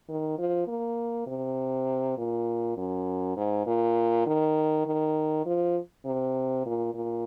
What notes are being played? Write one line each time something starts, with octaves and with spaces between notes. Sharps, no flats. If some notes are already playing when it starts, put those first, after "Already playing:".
D#3
F3
A#3
C3
A#2
F#2
G#2
A#2
D#3
D#3
F3
C3
A#2
A#2